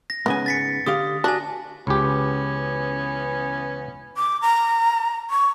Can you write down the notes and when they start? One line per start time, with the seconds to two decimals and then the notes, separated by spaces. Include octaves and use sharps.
0.10 A#6
0.26 G#2 C#3 B3 G#5
0.46 A6 B6 C#7
0.86 D3 G4 F5 D#6
1.24 D4 F#4 G#5 A#6
1.87 C#2 E3 B3 C#4 G4
4.15 D6
4.41 A#5
5.30 C#6